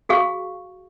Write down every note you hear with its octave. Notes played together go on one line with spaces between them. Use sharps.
F#4 G#4 F5 C#6